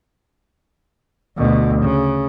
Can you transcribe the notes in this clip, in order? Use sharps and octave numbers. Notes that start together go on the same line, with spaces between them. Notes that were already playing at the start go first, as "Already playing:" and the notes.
D2 B2
C#3